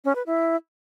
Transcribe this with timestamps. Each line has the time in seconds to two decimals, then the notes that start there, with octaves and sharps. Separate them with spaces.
0.05 C#4
0.15 B4
0.26 E4